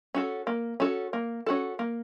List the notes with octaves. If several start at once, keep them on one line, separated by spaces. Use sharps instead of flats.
C#4 F#4 A4
A#3
C#4 F#4 A4
A#3
C#4 F#4 A4
A#3